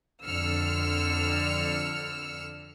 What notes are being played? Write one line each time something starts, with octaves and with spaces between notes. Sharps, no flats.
F2 D3 E6 F6 C#7